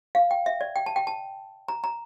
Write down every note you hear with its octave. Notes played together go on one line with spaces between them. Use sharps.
F5
G5
E5
D5
G5
A5
G5
A5
A#5
A#5